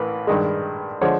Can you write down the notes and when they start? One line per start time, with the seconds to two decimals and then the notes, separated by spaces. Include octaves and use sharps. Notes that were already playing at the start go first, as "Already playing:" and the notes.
Already playing: A1 A2 E3 A#4 B4
0.27 G2 D#3 G#3
1.01 D3 F3 G#3 C#5